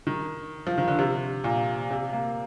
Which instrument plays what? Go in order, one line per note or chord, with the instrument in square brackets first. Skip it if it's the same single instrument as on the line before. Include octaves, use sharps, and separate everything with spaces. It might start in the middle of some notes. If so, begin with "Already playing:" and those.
[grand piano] D#3
F3
D#3
D3
C3
A#2
C3
A#3